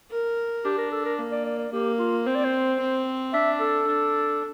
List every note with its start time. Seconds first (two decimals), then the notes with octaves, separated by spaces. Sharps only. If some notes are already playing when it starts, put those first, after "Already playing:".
0.11 A#4
0.65 D4 G4
0.78 A#4
0.92 A4
1.05 A#4
1.19 A#3
1.32 D5
1.46 D5
1.59 D5
1.72 A#3 G4
1.99 F4
2.26 C4 C5
2.35 D5
2.44 C5
2.80 C4
3.33 D4 E5
3.60 A4
3.87 D4